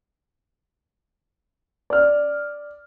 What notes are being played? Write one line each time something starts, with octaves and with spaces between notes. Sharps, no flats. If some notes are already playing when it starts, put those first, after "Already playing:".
D5 F6